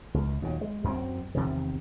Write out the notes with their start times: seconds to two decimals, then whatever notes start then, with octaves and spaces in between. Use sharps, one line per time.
0.14 C#2
0.42 D#2 A#2 F#3
0.61 G#3
0.84 F#2 F#3 A3 C4
1.35 E2 C3 D#3